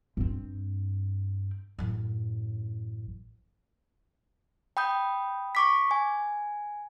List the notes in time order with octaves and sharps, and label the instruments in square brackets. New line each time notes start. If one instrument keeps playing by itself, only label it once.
[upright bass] G2 C4
A1 F#2
[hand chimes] G5 B5 D#6 G6
C#6 D6 B6
G#5